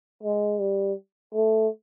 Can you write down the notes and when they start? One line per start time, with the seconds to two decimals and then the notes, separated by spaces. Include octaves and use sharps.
0.23 G#3
0.59 G3
1.34 A3